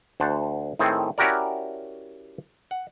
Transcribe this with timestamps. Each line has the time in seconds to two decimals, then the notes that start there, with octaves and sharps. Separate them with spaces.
0.20 D2 C5 F#5 A5
0.79 A2 D#3 C4 G#4 A4
1.18 C#4 E4 F#4 G4 A#4 D5
2.71 F#5